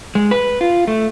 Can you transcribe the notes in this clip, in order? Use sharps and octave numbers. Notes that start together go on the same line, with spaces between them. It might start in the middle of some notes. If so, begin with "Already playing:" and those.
G#3
B4
F4
A3